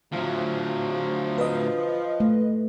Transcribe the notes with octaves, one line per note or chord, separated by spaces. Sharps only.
D2 F3 F#3
B4 D#5
A3